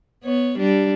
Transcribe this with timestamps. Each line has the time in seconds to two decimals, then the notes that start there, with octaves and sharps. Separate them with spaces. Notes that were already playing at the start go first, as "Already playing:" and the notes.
0.24 B3 C#5
0.58 G3 D4